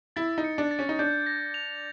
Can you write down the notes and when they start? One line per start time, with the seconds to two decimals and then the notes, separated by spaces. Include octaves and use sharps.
0.16 E4 A6
0.38 D#4
0.44 C#7
0.58 D4
0.71 A6
0.79 C#4
0.89 D#4
0.99 D4 G6
1.27 A#6
1.54 F7